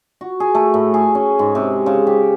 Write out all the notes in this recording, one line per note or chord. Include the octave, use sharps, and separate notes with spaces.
F#4
G#4
A3
A2
G#4
C#4
G#2
C3
C#3
G4